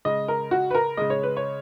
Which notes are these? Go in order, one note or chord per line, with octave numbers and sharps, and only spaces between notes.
C#3 G#3 D#5
A#4
F#4
B4
A#4
C#3 G#3 D#5
C#5
B4
C#5